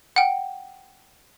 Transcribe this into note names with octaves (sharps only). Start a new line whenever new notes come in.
F#5 G5